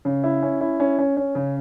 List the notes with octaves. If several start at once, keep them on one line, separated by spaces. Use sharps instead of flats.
C#3
E4
C#4
E4
C#4
C#4
C#4
C#3